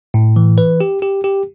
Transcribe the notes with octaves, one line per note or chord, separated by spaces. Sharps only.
A2
E3
B4
G4
G4
G4